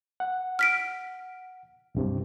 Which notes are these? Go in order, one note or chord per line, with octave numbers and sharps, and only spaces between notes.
F#5
F6 B6 D7
C2 G2 C3